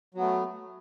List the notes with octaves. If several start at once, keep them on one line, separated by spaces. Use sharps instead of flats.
F#3 A3 B3